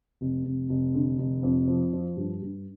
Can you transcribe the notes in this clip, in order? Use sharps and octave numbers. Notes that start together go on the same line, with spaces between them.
F1
F1
F1
D3
F1
F2
F3
F3
G2
G2